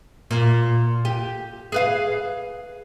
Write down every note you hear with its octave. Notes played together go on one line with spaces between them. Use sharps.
A#2
G4
G#4 B4 F5